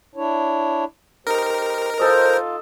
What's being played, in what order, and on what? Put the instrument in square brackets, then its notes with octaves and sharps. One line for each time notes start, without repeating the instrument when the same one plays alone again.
[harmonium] D4 E4 C#5
[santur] D#4 [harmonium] G4 C5 [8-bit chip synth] A#4
[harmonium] F4 [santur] A4 D#5 [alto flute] C5